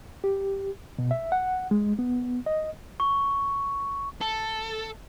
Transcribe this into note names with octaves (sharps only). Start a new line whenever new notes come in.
G4
B2
E5
F#5
G#3
B3
D#5
C#6
A4